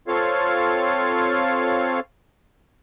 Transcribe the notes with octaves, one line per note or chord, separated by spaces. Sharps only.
C4 F4 A4 C#5 F5